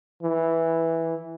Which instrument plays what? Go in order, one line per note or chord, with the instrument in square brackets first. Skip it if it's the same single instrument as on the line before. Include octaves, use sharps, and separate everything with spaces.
[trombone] E3